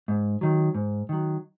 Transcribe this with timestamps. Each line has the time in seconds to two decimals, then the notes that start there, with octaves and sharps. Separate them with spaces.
0.08 G#2
0.41 D#3 F#3
0.75 G#2
1.09 D#3 F#3